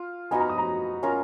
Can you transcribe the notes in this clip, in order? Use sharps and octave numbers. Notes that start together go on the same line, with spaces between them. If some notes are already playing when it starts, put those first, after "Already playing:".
Already playing: F4
B3 D#4 F#4 G#5
A#5
D#6
A#5
C#4 F4 A#4